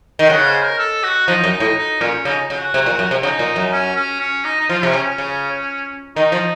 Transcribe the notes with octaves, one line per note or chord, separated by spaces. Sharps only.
D#3
C#3 F#5
C5
A#4
A4
F#4
F3 D#4
F#2
D#4
A2
D#4
A#2 C#4
C#3 D#4
C#3
F#4
C3
A#2
F#2
C3
C#3 D#4
A#2
F#2
C#4
C#4
C#4
D#4
D#4
F3 F4
C3 C#4
C#3
C#4
C#3
D#3 D#4
F3